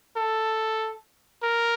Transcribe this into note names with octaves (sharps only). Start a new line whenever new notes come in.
A4
A#4